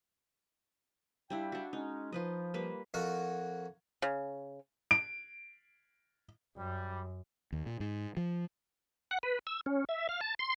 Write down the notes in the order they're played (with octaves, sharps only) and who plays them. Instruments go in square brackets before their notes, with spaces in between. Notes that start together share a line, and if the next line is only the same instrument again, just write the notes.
[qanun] G3 D4 E4 [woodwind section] F4 E5 G5
[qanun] D4 F#4
[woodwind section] G#3 C#4 [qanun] D#4
[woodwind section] F3 [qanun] F4 B4 D#5
[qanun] G3 A#3 B4
[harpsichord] F2 F#4 A#4
[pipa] C#3
[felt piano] D7
[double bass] F#2 [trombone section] G3
[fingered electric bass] D#2
A#2
G#2
F3
[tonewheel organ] F#5
B4
E6
C#4
E5
F5
A5
C6